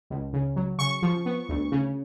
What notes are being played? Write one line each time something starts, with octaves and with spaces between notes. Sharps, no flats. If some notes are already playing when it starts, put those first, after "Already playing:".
C#2
C#3
F#3
C#3 C#6
F3
B3
D2
C#3